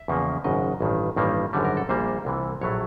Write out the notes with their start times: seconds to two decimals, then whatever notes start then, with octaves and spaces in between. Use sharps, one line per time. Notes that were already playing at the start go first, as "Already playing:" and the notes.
Already playing: E5
0.08 E2 C#3 F3 A#3
0.44 G#1 F#2 C#3 D#5
0.81 A1 G2 D#3
1.16 A1 G2 D#3 G3 A#3
1.53 G#1 F#2 D3 G3
1.65 A#4
1.77 A4
1.89 A#1 A#2 G3 A#3 C5
2.25 C2 C3 E3
2.61 A#1 A2 F#3 A3 C#5